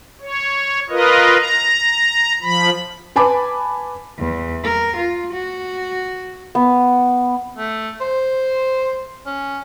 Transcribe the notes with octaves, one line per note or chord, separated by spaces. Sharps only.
C#5
F4 A#4 B4 D#5
A#5
F3 B5
B4 G#5 A5 B5 D6
E2
A#4
F4
F#4
B3
A3
C5
C#4